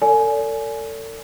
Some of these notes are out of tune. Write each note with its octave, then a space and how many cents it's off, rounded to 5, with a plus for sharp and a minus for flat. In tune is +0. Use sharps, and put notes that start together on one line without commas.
A4 +35 D5 -40 G#5 +20